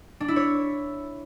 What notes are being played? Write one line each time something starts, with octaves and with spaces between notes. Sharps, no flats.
D4
E4
C#5